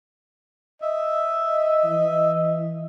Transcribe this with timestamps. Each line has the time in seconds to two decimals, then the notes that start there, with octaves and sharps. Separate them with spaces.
0.81 D#5 E5
1.84 E3